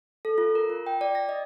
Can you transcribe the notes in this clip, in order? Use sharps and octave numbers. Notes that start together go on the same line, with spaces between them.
A4
F4
A#4
F4
G5
D5
A#6
D#5